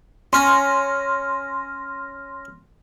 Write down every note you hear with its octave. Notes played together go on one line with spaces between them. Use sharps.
C#4 C6 F6 A#6